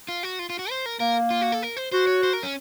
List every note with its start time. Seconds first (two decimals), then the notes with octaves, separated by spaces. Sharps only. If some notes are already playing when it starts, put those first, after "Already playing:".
0.09 F4
0.23 F#4
0.39 F4
0.50 F4
0.59 F#4
0.70 C5
0.86 A#4
1.00 A#3 A#4
1.31 F4
1.41 F#4
1.52 A4
1.62 A#4
1.77 C5
1.92 F#4 C5
2.07 C#5
2.23 C5
2.33 A#4
2.43 C#4